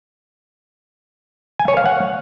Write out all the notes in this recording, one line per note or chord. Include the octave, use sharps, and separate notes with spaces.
G#5
C#5
F5
F#5